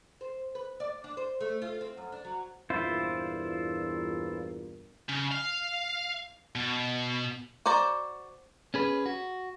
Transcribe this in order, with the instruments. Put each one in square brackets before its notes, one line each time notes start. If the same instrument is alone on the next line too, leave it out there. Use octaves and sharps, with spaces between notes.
[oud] C5
B4
D5
D4
C5
A3
F4
C4
F#2
D4
F#3
[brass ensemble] E2 G2 A#2 [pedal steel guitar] E4 F4 C5
[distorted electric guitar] C#3
F5
B2
[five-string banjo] F#4 C5 D5 A#5
[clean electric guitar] C#4 G#4 B4
F#4